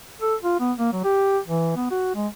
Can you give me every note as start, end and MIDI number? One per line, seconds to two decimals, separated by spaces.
0.21 0.35 69
0.43 0.57 65
0.60 0.72 59
0.78 0.92 58
0.93 1.01 54
1.04 1.38 67
1.47 1.75 52
1.76 1.88 59
1.91 2.12 66
2.15 2.27 56